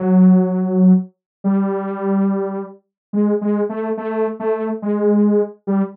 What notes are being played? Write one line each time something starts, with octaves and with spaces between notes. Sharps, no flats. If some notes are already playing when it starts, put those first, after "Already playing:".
Already playing: F#3
G3
G#3
G#3
A3
A3
A3
G#3
G3